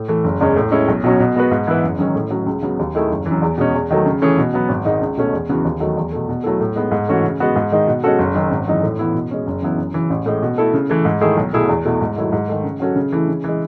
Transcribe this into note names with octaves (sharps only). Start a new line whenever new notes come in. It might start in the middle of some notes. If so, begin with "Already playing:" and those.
Already playing: A2
E3 A3
F#1
E2 C#3 G#3 C#4
A2
G#3 C#4 E4
B1
B2 F#3 C#4
B2
G#3 B3 F#4 B4
G#2
E3 B3 E4 B4
F#1
F#2 D#3 G#3 C#4
A2
F#3 A3 C#4
C#2
C#3 F#3 B3
D#2
D#3 A3 E4 G#4
F#1
F#2 E3
E2
B2 G#3 C#4
E2
D#3 F#3 A3
C#3
E3 A3 C#4 G#4
B2
F#3 B3
G#1
G#2 D#3 G#3 D#4
C#2
B2 A3 C#4
E2
C#3 E3 B3 F#4
D#2
D#3 F#3 A3
E2
B2 A3
B2
F#3 A3 E4 A4
A2
G#3 B3 D#4
G#2
E3 A3 C#4 F#4
C#3
G#3 B3 F#4
G#2
D#3 G#3 D#4
B2
G#3 C#4 F#4 A4
F#1
F#2 D#3
G#1
F#2 E3 G#3 D#4
A2
E3 B3 E4
B2
G#3 C#4
F#1
F#2 E3 B3 E4
F#2
C#3 E3
A1
A2 G#3
B2
A3 E4 A4
C#3
E3 A3
G#2
D#3 A3 E4 G#4
B1
B2 A3 E4 G#4
E2
B2 A3 E4
G#2
D#3 F#3 A3 E4
G#2
D#3 A3
C#3
F#3 C#4 F#4 A4
C#3
E3 A3 E4
C#3
E3 G#3